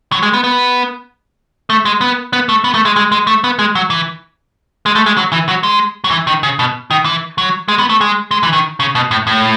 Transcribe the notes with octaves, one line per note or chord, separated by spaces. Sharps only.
F#3
G#3
B3
B3
A3
G#3
B3
B3
A3
B3
A3
G#3
G#3
G#3
A3
B3
G#3
F#3
E3
G#3
A3
G#3
F#3
E3
F#3
G#3
F#3
E3
D#3
C#3
B2
D#3
E3
F#3
G#3
B3
A3
G#3
G#3
E3
D#3
C#3
B2
A2
A2